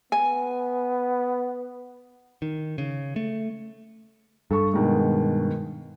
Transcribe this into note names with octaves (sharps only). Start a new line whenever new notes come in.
B3 G#5
D#3
C#3
A3
G2 A4 C#6
B2 D#3 G#3